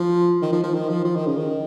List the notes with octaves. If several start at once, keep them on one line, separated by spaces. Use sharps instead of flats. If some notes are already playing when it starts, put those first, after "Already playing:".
Already playing: F3
D#3
F3
F3
D#3
F3
F3
D#3
C#3
D#3